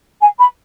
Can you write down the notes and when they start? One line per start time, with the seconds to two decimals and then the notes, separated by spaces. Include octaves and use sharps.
0.20 G#5
0.39 B5